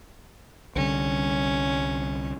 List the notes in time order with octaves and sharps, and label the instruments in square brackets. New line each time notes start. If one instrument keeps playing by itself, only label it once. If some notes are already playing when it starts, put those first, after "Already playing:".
[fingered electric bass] C2 D3 G3 [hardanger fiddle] C#4